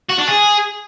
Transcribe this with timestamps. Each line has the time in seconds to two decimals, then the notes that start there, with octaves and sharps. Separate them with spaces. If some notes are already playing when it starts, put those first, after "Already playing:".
0.10 F#4
0.19 D4
0.28 G#4